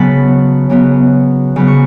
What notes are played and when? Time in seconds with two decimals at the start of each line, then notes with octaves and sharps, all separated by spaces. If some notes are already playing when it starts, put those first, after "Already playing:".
Already playing: C#3 F#3 B3 F#5 A5 B5
0.70 C#3 F#3 B3
1.56 C#3 F#3 B3 B5
1.67 C#6